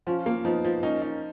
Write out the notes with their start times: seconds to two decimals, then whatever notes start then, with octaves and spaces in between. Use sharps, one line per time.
0.07 F3 C#4 F4
0.26 A#3
0.44 F3 B3 D#4
0.64 F3
0.83 A#3 C#4 D#4
1.02 D#4